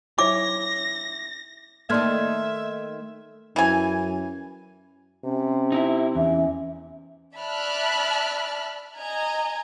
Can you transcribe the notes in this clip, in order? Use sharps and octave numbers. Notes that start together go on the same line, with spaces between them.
E4 C#5 D6 A#6
D#3 A3 A#3 D5 E5 C6 F6 G#6
F#2 E3 G#5
C3 C#4
D#4 E4 E5
E2 C#4 E5
D5 E5 A5 B5 F6 F#6
D#5 G#5 A#5 G#6